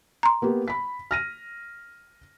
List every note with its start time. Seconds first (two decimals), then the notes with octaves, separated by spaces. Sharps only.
0.23 A#5 C6
0.42 A#3 B3 G4
0.68 B5 B6
1.11 F6 A#6 D#7